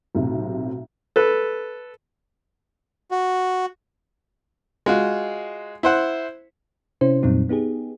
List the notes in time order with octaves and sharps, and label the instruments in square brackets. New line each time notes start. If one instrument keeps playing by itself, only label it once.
[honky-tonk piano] B1 A2 C3
[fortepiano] A4 B4
[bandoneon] F#4
[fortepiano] G#3 F4 F#4
E4 C5 F#5
[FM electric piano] C3 C#4 E4 C5
F2 A#2 F#3 G3 C4 D#4
B3 D#4 G4 G#4